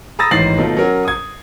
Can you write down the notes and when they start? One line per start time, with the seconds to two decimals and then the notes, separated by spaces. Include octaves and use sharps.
0.19 A#5 B5 D#6 E6 A6 A#6
0.31 A1 G#2 D#3 A6 C7 F#7
0.58 B2 D#3 A3 F4
0.77 F#3 C#4 A#4
1.05 D#6 G#6